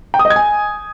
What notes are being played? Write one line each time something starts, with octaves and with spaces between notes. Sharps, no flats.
G5
D#6
D#5
G#6
G#5